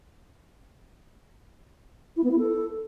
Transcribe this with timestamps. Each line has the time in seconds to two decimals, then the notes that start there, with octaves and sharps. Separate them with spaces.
2.16 E4
2.23 B3
2.31 E4
2.38 A4